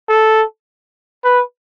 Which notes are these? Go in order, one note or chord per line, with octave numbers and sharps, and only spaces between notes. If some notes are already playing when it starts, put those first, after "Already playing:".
A4
B4